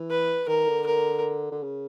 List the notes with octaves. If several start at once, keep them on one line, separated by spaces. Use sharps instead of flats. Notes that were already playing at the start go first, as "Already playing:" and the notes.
Already playing: E3
B4
D#3 A#4
D3
A#4
D3
C#3